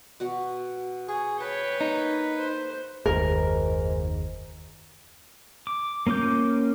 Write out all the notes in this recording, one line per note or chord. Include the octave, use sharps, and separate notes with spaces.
B2 F#4 F#5
G#4 C#6
B4 C#5 G5 A5
A#3 D#4
C5
F#1 D#2 G#2 A#4
D6
A#3 C#4 F4 D6 G6